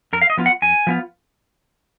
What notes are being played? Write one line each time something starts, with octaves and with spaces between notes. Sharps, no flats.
F2 A#4
F5
D#5
F3 B3 F4
F#5
F2 G#5
F3 B3 F4